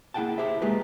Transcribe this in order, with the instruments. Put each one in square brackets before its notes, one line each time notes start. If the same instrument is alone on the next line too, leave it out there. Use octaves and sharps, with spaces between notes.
[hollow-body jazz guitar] A#3 E4 G#4 F#5 G5 A5
E4 G4 G#4 C5 E5
G#3 A#3 F4 G4 G#4 B4